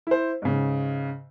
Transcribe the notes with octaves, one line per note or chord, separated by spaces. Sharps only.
E4 C5
G#2 C#3